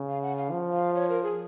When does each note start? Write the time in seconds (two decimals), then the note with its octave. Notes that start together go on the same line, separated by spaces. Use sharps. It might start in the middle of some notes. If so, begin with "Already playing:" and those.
Already playing: C#3
0.09 F5
0.22 F#5
0.37 F5
0.51 F3
0.72 F5
0.94 C#5
1.09 A#4
1.23 G#4